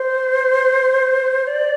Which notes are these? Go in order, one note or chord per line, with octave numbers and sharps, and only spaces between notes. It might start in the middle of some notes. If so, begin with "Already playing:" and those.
Already playing: C5
D5